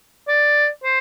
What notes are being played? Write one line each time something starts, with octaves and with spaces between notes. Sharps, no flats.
D5
C5